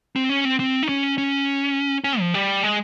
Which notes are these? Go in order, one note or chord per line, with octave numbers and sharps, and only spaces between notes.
C4
C#4
C4
C4
D#4
C#4
C#4
C#4
F3
G3
G#3